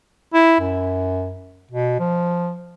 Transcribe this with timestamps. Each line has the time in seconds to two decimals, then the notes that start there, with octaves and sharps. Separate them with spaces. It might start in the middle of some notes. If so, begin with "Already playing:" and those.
0.33 E4
0.60 F#2
1.71 B2
1.99 F3